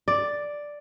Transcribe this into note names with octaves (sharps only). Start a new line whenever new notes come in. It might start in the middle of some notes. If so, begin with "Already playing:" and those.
D5